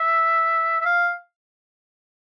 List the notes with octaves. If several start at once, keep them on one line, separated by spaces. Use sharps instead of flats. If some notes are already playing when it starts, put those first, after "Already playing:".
Already playing: E5
E5
F5